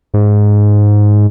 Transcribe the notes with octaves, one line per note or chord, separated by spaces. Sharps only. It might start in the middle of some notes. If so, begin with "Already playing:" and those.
G#2